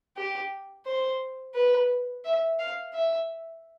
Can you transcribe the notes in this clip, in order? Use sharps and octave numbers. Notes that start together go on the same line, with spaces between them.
G4
C5
B4
E5
F5
E5